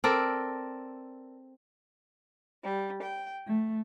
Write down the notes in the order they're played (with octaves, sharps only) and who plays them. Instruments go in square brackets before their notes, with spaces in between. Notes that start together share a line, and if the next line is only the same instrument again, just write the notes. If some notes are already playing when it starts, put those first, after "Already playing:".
[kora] C4 A4 A#4 D5
[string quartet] G3
G5
A3